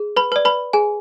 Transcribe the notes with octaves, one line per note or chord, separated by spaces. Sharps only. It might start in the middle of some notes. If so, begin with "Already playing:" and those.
Already playing: G#4
B4 B5
B4 D5
B4 B5
G#4 G#5